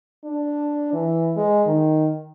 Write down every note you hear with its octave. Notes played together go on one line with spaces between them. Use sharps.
D4
E3
G#3
D#3